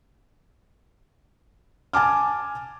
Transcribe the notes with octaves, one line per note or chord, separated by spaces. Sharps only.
G#5 A5 D6 F6